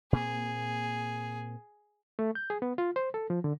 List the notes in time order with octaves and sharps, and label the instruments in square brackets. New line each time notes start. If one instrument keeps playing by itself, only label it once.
[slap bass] A#2 A#3 C4 [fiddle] G#4
[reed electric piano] A3
G6
G#4
B3
F4
C5
A4
F3
D3